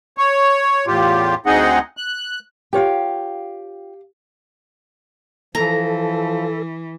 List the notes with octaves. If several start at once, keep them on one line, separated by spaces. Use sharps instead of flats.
C#5
E2 A2 F4 G4
D2 C4 D#4 G#4 D#5 F#5
F#6
F4 G4 C#5 F5 G5
E3 F3 A4 A#5